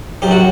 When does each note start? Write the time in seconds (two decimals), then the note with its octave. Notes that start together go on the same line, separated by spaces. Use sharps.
0.22 F#2 G4
0.31 F#4